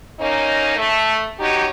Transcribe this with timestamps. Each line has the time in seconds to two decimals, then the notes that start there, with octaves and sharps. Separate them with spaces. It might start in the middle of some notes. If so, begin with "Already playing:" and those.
0.19 A#3 C#4 D#4
0.77 A3
1.39 C#4 D#4 F#4 G4